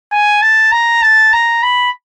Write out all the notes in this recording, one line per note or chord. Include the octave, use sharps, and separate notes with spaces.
G#5
A5
A#5
A5
A#5
B5